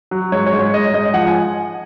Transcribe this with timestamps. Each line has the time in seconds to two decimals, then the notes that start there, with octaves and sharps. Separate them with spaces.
0.11 F#3
0.32 G#2 C#5
0.46 C#5
0.53 G#2
0.59 C#5
0.74 G#2 D#5
0.94 G#2 D#5
1.14 F3 F#5
1.27 G#5